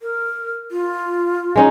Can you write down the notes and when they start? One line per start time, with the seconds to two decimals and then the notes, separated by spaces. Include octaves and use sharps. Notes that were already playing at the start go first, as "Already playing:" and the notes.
0.01 A#4
0.71 F4
1.56 G#3 C#4 D#4